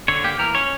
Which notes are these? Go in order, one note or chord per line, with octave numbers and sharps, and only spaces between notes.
D3 C#5
A#3 G4
E3 A#4
C#4 C#5